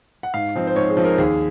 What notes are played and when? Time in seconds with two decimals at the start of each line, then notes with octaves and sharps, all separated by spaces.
0.23 F#5
0.34 G#2 F5
0.56 F3 C4 D#4
0.67 C5
0.76 G#2 C#5
0.90 G#4
0.97 F3 C4 D#4
1.04 A#4
1.18 D#2 G#4